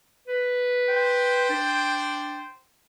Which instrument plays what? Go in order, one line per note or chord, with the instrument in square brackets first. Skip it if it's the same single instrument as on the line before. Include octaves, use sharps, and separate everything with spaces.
[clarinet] B4
[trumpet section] C5 G5
[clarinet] D4